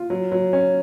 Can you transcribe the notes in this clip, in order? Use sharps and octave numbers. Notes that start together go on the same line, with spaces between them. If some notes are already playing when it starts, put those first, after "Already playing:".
Already playing: F4
F#3
F#3
C#4